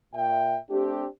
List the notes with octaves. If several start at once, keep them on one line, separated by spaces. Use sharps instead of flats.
A#2 E5 G5
A3 C4 D4 G4